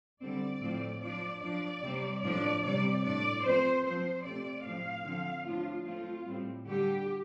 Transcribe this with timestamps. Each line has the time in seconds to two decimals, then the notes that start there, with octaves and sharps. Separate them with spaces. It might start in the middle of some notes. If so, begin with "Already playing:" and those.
0.21 D3 G3 C4 D5
0.61 A2 F3 A3 C4
1.02 F3 D4 D5
1.42 F3 D4 D5
1.83 C3 G3 C4
2.23 A2 F3 D4 D5
2.63 C3 G3 C4 D5
3.03 A2 A3 D4 D5
3.44 F3 A3 C4 C5
3.84 F3 C4 C5
4.24 C3 A3 C4 D5
4.65 A2 F3 C4 F5
5.05 D3 F3 C4
5.45 A2 F3 D4 F4
5.86 F3 A3 C4 F4
6.26 A2 G3 C4
6.66 D3 G3 D4 G4